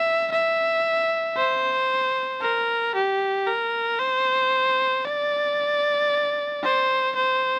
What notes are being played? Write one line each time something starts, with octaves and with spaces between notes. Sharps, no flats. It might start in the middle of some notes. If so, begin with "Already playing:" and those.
Already playing: E5
E5
C5
A#4
G4
A#4
C5
D5
C5
C5